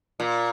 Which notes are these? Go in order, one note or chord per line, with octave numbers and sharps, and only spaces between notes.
A#2